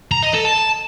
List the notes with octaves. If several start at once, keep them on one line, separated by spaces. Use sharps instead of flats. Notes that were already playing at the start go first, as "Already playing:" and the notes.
A#5
D#5
A4
A5